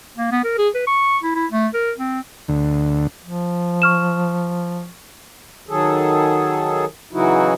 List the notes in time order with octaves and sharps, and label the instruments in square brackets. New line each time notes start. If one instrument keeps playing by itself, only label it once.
[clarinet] A#3
B3
A#4
G#4
B4
C#6
E4
E4
A3
A#4
C4
[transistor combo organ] D2
[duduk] F3
[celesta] C#6 F6 E7
[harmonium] D#3 F#3 G#4 A4
C#3 E3 F#3 D#4 E4 F#4